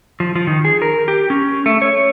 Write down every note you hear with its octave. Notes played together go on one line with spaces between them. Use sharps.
F3
F3
D#3
G#4
A#4
G4
C#4
A3
C#5